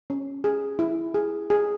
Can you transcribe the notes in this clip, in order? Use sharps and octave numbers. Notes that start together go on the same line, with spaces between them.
C#4
G#4
E4
G#4
G#4